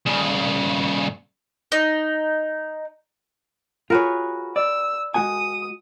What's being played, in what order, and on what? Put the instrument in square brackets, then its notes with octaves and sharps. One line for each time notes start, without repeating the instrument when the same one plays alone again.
[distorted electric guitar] G2 C#3
[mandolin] D#4
[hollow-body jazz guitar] F4 F#4 G#4 [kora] A#4 B4 C#5
[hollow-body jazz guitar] D5 [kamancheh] E6
[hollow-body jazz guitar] G#3 F#4 G#5 [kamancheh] D#6